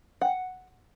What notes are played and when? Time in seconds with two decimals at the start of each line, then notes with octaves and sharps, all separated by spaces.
0.21 F#5